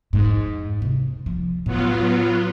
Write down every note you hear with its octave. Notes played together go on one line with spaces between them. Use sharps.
F2 G#2
C3
F3
A2 F#3 B3 F4